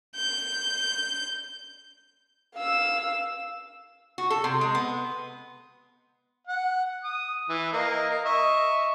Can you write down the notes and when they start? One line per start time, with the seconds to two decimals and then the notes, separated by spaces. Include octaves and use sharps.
0.16 G6
2.55 F5 E6
4.18 F#4
4.30 A4
4.44 C3
4.61 G#3
4.75 B3
6.47 F#5
7.04 D#6
7.49 E3
7.73 A#3 D#5
8.09 A#4
8.25 D#5 E5 C#6